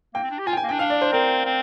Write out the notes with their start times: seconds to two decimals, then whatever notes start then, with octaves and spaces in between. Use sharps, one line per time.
0.14 A#3 G5
0.23 C4
0.31 D4
0.38 G4
0.47 F4 G#5
0.53 G5
0.57 G#5
0.63 A#3
0.69 D4 G5
0.79 D4 F5
0.90 D5
1.02 C5
1.12 C4 A#4
1.45 C4